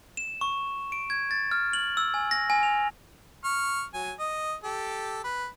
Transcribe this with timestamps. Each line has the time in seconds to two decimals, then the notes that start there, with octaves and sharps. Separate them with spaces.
0.17 E7
0.41 C#6
0.92 D7
1.10 G#6
1.31 A6
1.51 F6
1.73 F#7
1.97 E6
2.14 G#5
2.31 A#6
2.50 G#5
2.63 F7
3.45 C#6 F6
3.94 F#3 G#5
4.19 D#5
4.64 G4 A4
5.24 B4